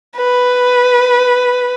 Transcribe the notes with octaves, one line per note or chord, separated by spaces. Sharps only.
B4